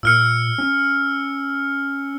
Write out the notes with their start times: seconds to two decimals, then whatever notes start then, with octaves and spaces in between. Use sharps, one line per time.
0.03 A#2 E6 F6 C#7
0.58 C#4